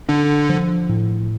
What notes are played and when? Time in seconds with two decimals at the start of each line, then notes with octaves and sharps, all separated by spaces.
0.09 D3 D4
0.49 F3
0.89 A2